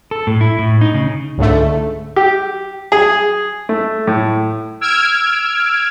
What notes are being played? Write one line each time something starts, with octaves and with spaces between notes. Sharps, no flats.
A4
A2
E4
A2
D#4
C#3
C#2 G#2 D3 A3
G4
G#4
A3
A2
E6 F6 G#6 D7